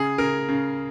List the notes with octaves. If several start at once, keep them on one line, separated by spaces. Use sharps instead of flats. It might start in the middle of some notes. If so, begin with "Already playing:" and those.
Already playing: C#3 G#4
C#3 A#4
C#3